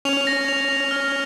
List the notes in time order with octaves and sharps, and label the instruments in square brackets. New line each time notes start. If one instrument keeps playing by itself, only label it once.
[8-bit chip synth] C#4 [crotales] F7
[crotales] A#6
F7
F7
F6